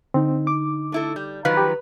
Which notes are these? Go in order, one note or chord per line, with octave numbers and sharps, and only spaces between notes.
D3 C4 D#4
D6
A3 E4 A4
G3 G6
D#3 F3 F#3 B4 F5 B5
G4